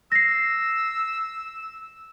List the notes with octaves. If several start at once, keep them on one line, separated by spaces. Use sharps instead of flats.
E6 A#6 C7